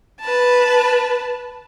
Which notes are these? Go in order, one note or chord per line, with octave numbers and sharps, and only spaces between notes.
B4 A5